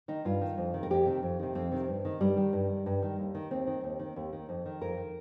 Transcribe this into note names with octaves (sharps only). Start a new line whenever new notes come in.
D#3 D#4
G2 F4
D#3
F2
C3 D#3
A#4
F2 G4
C3 D#3
F2
C3 D#3
F2 C4
C3 D#3
G2
D#3
G2 G3
D#3
G2
D#3
G2
D#3
D#2
D#3
D#2 C4
D#3
D#2
D#3
D#2
D#3
F2
D#3
F2 A#4
D#3